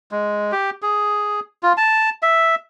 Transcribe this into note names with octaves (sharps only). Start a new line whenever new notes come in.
G#3
G4
G#4
F4
A5
E5